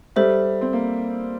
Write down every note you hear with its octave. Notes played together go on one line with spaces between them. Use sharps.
G3 A4 C5 E5
C4
A#3